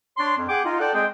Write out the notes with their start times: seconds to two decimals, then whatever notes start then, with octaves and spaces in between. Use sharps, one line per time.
0.17 D4 C#5 C6
0.36 F2
0.48 G#4 F#5 G5 D6
0.65 D#4 F4
0.79 A4 D5 F#5 G5
0.93 G#3 C4 G#4 D#5 G5